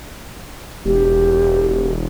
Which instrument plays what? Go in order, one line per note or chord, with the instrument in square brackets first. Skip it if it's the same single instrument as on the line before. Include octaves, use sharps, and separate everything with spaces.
[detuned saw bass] E1 [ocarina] G4